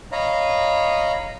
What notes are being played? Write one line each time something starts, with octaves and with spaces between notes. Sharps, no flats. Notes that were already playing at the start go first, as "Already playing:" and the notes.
C#5 D#5 F5 A#5 B5